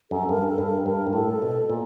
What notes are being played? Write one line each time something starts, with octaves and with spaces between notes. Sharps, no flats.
F#2 A4
G2 A#4
A4
G2
A#4
G2 A#4
G#2
A2 A4
B2
A#2